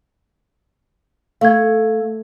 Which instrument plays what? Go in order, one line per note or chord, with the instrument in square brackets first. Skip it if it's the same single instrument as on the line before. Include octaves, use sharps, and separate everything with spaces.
[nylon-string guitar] A3 [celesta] F5 G#6